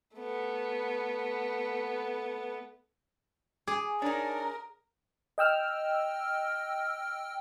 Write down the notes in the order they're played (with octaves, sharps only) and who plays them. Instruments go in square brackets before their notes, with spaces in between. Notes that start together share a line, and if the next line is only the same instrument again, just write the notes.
[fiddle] A3 B3
[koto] G#4 [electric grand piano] D6
[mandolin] D4 D#4 [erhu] A#4 [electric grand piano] C#5 D5 G#5
[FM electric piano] D#5 G5 E6 F6